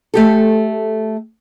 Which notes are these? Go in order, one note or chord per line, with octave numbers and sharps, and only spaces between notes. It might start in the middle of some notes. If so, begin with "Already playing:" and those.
A3 G4 A4